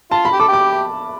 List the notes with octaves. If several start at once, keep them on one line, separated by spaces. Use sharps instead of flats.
F4 A5
B5
G4
A4 D6
G4
D6